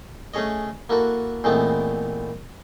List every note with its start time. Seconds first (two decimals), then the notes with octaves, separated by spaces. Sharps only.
0.34 A3 C#4 G#4 C#5 D#5
0.89 A#3 E4 F#4 A4 B4
1.44 A#2 E3 G#3 A3 B3 C4